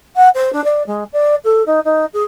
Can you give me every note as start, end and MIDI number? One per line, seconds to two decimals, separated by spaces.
0.16 0.29 78
0.35 0.53 72
0.53 0.64 62
0.64 0.83 74
0.87 1.04 56
1.13 1.35 74
1.44 1.63 69
1.66 1.80 63
1.85 2.05 63
2.13 2.23 68